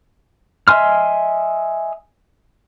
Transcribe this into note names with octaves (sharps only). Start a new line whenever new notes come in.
D#5 E5 G#5 C6 F6